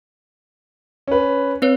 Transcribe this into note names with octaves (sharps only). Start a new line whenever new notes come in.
C#4 B4
C4 B4 C#5